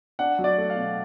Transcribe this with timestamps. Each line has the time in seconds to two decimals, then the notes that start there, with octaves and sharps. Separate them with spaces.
0.19 D4 F#5
0.39 F#3
0.44 D5
0.58 A3
0.70 F5
0.76 B2